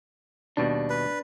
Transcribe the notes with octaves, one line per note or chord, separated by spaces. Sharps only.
D#2 B2 G3 D4
B4